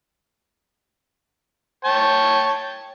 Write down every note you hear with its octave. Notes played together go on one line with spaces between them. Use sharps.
C#5 G5 A5